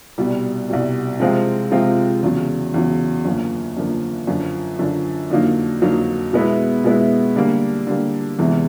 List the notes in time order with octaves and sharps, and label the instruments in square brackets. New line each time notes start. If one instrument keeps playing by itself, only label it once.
[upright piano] C2 B2 G3
C2 B2 G3
C3 F3 G#3 C4 F4
C3 F3 G#3 C4 F4
E2 C#3 F#3
E2 C#3 F#3
F#2 D3 F3 A#3
F#2 D3 F3 A#3
F#2 D3 F3
F#2 D3 F3
F2 D3 F#3 A#3 D#4
F2 D3 F#3 A#3 D#4
B2 G#3 B3 E4
B2 G#3 B3 E4
D3 G3 A#3
D3 G3 A#3
E2 C3 E3 G#3